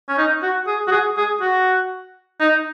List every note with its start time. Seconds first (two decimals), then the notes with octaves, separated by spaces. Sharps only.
0.09 C#4
0.18 D#4
0.43 F#4
0.67 G#4
0.88 F#4
0.92 G#4
1.17 G#4
1.41 F#4
2.40 D#4